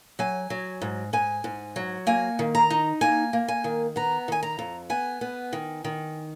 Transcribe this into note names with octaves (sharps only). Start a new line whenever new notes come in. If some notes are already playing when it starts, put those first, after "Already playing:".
F#3 G#5
F#3
G#2
G#2 G#5
G#2
F#3
A#3 G#5
D#3
A#5
D#4
A#3 G#5
A#3
G#5
D#3
B3 A#5
D#3 G#5
A#5
F2
B3 G#5
B3
D#3
D#3